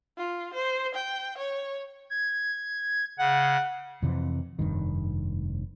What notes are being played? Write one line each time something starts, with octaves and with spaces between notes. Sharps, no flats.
F4
C5
G5
C#5
G#6
C#3 F#5
F2 C3 E3
F1 G2 D#3